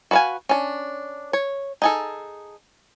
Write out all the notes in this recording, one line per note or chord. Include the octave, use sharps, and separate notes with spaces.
F#4 B4 D5 F5 G#5
C#4 D4
C#5
D#4 G#4 A4